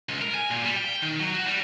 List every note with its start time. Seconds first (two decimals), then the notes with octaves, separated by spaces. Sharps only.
0.09 C#2
0.21 A#4
0.35 G#5
0.51 A#2
0.65 G3
0.76 G5
1.02 D#3
1.19 F#3
1.34 F#4
1.47 G3